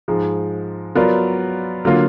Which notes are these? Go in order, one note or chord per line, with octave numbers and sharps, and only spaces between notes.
G#2 F3 G#3
F#3 B3 F4 A#4 D5
D3 F#3 A#3 F4